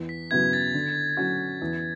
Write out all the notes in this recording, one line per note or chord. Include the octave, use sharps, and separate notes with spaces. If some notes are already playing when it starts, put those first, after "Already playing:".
Already playing: E2
B6
C#3 F#3 B3 E4 G#6
A6
D3
F#3 C#4 F#4
E2